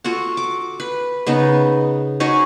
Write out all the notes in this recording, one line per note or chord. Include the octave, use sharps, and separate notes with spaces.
F4 F#4 A4 F#5
D6
B4
C#3 B3 D#4
C#4 D#4 F#4 G#4